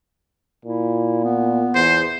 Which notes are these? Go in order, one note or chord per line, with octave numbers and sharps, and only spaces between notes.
A#2 E4
B3
E2 C5